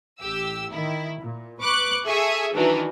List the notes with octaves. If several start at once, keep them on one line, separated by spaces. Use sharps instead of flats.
A1 G4 E6
D#3 E4
A#2
B4 C#6 D6 F#6
G#4 A4 E5 G#5 C#6 D#6
D#3 E3 F#3 D4 D#4 F#4